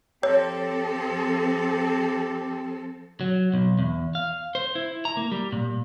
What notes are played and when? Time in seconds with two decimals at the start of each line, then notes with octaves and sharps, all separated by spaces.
0.23 F3 C4 G4 A4 C#5
3.21 F#3
3.54 B1
3.79 E2
4.15 F5
4.55 C5
4.75 E4
5.05 A#5
5.17 A#3
5.32 G3
5.52 A#2